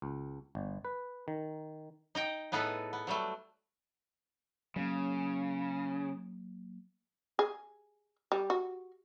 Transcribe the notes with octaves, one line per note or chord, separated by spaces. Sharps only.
C#2
G1
B4
D#3
D#4 D#5 G5
A2 B3 D#4 G#4 A4 B4
B3
F#3 G3 A3
C#3 F#3 A#3
G#4
G3
F#4